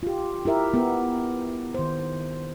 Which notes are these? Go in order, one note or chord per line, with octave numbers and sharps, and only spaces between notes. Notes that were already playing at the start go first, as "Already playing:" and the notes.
F4 G4
E4 G4 A#4 E5
B3 A#4
D#3 C5